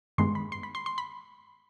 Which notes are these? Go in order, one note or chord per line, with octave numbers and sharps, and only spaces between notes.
G2 D#3 G#3 B3 C6
B5
C6
B5
C6
C6
B5